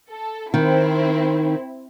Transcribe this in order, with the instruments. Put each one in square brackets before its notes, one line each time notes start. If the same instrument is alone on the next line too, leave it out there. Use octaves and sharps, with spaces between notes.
[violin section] A4
[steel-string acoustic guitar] D#3 [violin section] C4 E4